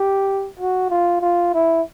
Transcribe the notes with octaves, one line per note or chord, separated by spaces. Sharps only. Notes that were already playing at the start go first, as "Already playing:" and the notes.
Already playing: G4
F#4
F4
F4
E4